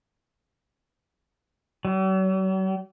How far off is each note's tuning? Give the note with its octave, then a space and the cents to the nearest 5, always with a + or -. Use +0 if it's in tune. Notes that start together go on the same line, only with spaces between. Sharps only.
F#3 +45